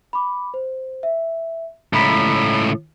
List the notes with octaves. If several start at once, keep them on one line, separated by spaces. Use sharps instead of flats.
B5 D6
C5
E5
C#2 A2 A#5 B5 B6